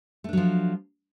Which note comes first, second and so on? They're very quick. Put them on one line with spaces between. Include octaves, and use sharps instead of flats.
A3 D4 F#3 F3